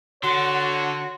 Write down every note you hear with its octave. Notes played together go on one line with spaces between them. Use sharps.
D3 F#4 C#5 C6